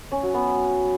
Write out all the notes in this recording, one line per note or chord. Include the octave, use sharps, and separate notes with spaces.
C#4
F#3
B3